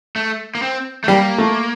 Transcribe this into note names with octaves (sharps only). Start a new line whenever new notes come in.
A3
A#3
C4
A3
G3 A#3
A3